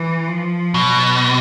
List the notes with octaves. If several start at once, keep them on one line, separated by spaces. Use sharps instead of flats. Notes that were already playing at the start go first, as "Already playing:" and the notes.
Already playing: E3
F3
B2 F#3